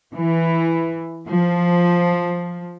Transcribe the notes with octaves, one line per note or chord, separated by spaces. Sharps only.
E3
F3